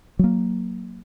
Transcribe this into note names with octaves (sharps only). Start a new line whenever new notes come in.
F#3 A#3